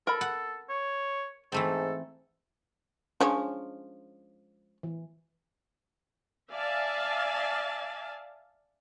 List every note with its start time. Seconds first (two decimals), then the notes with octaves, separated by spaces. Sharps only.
0.07 A4 A#4 B5
0.21 F#5
0.69 C#5
1.52 G#2 E3 A3 C4 A4
3.21 F3 G#3 C#4 D4 C#5
4.83 E3
6.51 D5 E5 F5 G#5 A5